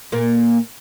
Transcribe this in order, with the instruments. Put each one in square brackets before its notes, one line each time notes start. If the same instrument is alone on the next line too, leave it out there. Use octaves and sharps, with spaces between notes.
[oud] A#2 A#3